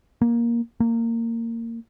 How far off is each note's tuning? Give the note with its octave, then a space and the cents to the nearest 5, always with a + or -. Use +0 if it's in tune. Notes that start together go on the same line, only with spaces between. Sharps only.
A#3 +10
A#3 -20